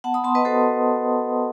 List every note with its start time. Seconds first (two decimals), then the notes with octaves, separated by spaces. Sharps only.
0.04 B3 F#5 A5
0.14 B5 D#6
0.24 B3 A5 C6
0.35 B4 D#5
0.45 F#4 A4 C5